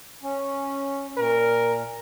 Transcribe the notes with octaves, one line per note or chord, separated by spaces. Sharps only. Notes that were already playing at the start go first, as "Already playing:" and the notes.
C#4
A#2 A#4